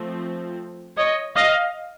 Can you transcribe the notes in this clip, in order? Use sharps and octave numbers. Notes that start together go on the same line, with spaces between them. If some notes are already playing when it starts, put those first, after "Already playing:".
Already playing: F3 A3 C4
C#5 D#5
D#5 F5